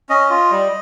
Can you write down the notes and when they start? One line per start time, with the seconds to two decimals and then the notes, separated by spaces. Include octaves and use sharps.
0.09 C#4 D#5
0.30 F4
0.51 G3